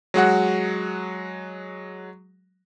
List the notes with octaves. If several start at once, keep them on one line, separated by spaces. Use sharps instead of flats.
F#3 G#3 F#4 F#5